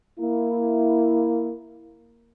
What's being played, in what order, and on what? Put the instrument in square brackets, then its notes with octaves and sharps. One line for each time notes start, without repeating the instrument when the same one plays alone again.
[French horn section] A#3 E4